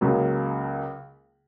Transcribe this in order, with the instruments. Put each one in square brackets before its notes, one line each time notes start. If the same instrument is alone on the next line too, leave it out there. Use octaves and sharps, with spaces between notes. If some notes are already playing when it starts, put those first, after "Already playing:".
[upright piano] C#2 C#3 F#3 A#3